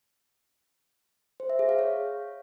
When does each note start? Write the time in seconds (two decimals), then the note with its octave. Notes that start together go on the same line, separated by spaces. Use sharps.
1.40 C5
1.50 E5
1.59 G#4
1.69 F5
1.79 C#5